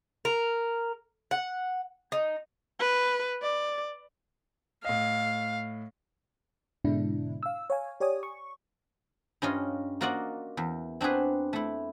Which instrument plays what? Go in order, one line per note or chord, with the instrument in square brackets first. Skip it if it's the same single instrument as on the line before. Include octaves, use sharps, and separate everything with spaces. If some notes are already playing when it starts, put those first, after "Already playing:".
[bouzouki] A#4
F#5
D#4
[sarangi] B4
D5
[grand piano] A2 D#5 [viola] F5
[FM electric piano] G#2 B2 D3 G#3 D4 E4
F5 E6
C#5 F5 G#5
G4 C#5 D5 G#5 D#6
C#6
[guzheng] G2 C#4 F4 D#5
A#3 F4 F#4 D5 D#5 F#5
E2
C4 D4 F#4 G#4 B4
A3 E4